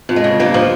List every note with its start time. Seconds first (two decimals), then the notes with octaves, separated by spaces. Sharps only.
0.09 F2
0.16 G#3
0.24 C#3
0.40 G2 A#3
0.54 F3